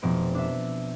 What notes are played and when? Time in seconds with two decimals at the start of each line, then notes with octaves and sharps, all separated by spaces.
0.02 F1 B2 C4 D7
0.35 D4 E5